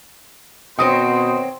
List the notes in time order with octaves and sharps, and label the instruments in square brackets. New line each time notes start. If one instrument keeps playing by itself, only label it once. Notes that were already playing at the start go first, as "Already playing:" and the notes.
[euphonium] B2 [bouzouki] D#3 F#3 C4 [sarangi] C5 [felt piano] D#6